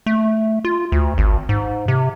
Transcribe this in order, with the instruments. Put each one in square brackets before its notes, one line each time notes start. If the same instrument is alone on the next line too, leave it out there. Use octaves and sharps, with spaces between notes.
[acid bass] A3
F4
D2
G#1
G#2
C3